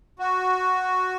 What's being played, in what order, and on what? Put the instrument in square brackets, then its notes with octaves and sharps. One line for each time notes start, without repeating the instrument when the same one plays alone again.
[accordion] F#4